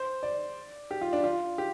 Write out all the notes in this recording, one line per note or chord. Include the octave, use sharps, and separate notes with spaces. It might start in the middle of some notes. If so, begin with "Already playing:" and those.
Already playing: C5
D5
G4
F4
D4
F4
G4